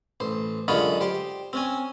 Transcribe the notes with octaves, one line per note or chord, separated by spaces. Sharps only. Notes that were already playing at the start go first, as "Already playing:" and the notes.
A1 C5
F#2 D3 G#3 F4 C#5 B5
G4 C5 G5
C4 C#4 G#5